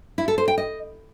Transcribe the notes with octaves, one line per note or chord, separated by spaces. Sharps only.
E4
A4
C5
G5
D#5